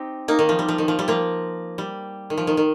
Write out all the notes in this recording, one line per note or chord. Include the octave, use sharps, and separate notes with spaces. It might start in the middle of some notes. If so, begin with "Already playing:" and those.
Already playing: C4 D#4 G4
A#3 D#4
D#3
F3
G3
F3
D#3
F3
G3
F3 A#3
G3
D#3
F3
D#3
D#3